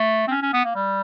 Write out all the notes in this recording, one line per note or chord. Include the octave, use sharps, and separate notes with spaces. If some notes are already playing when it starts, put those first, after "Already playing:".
Already playing: A3
C4
C#4
C#4
B3
A#3
G3